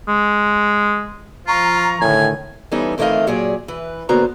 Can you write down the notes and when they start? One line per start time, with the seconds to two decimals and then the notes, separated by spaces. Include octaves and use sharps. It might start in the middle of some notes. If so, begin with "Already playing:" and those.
0.08 G#3
1.47 F3 F4 A#5 C#6
2.01 A2 D3 D#3 G#5
2.72 E3 G3 B3 C#4 D#4 A4
2.98 F2 D#3 E3 A3 D#5 F5
3.27 A#2 F#3 G4 G#4 D5
3.68 E3 B4
4.09 D3 A#3 B3 F#4 C5 A#5